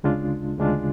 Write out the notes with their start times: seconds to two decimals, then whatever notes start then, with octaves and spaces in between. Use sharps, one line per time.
0.03 D2 C#3 G#3 D4 F4
0.58 D2 C#3 G#3 D4 F4